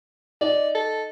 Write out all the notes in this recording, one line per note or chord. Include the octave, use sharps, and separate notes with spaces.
D#4 D5
A4